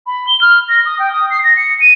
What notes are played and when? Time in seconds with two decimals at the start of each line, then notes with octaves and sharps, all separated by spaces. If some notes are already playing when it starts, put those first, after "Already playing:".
0.07 B5
0.27 G7
0.41 F6
0.69 A#6
0.85 D#6
0.99 G5
1.12 D#6
1.30 C7
1.44 A#6
1.56 C#7
1.80 D#7